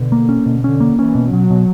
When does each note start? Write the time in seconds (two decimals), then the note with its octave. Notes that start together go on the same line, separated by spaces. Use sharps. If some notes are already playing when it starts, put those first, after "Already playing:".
Already playing: B2 D3
0.12 A#3
0.29 C#4
0.46 B2
0.64 D3 C#4
0.80 A#3
0.98 E3 C#4
1.15 B2
1.33 B2 F#3
1.50 B2